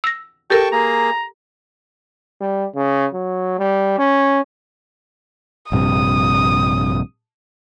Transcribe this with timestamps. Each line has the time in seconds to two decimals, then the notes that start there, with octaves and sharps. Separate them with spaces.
0.04 E6 A#6
0.50 G4 A4 A#4 G5 A5 C#6
0.73 A#3 G#4 A#5
2.41 G3
2.76 C#3
3.14 F#3
3.59 G3
3.99 C#4
5.72 A#1 G2 C3 D#6